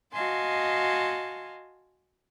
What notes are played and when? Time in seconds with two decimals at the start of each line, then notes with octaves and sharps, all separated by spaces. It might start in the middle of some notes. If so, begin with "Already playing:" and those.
0.12 F#4 D#5 F5 G#5 A5 C6